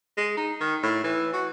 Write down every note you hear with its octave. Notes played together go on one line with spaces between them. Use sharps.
G#3
D#4
D#3
A2
E3
F#4